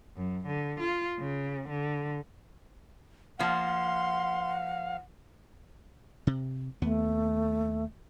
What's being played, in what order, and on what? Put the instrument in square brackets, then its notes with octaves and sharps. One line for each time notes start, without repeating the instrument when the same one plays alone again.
[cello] F#2
D3
F4
C#3
D3
[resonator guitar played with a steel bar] F3 A#3 [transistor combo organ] F5 [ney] F#5 [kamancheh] C6
[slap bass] C3
[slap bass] D#2 B3 [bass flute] A3